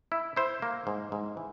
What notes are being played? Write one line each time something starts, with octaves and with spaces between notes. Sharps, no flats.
E4
E4 C5
A#3
G#2
G#2
E3